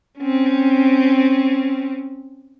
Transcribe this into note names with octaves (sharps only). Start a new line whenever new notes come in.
C4 C#4